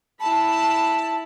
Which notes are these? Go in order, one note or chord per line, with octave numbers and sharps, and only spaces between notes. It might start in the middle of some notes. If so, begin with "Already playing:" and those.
E4 A5 B5